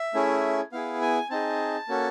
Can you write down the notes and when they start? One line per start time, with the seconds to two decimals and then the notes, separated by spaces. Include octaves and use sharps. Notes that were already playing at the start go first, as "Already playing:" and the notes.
Already playing: E5
0.14 A3 C#4 E4 G#4
0.72 B3 E4 G#4 F5
1.01 G#5
1.30 C4 D#4 G#4 A5
1.88 A#3 C#4 F#4 A4